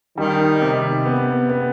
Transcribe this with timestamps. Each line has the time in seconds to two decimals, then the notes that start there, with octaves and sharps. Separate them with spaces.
0.17 D#3 G3
0.62 C3
1.05 B3
1.49 B3